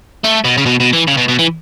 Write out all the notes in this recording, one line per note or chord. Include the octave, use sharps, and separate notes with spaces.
A3
B2
C#3
B2
B2
E3
C#3
B2
B2
E3